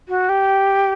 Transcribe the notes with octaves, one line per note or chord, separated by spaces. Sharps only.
F#4
G4